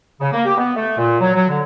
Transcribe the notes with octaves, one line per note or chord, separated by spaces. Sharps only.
C#3
A#3
G4
B3
A3
A#2
F#3
F#3
D3